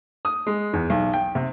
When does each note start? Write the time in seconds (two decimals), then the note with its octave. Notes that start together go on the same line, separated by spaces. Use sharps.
0.25 D#6
0.47 G#3
0.73 E2
0.90 B1
1.13 G5
1.35 C3